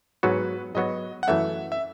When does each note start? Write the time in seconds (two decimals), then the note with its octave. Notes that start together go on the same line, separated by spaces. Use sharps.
0.23 G#2 F#3 B3 F#4 B4
0.75 G#2 F#3 B3 F#4 D#5
1.23 F#5
1.27 F#2 E3 A3 C#4 E5
1.72 E5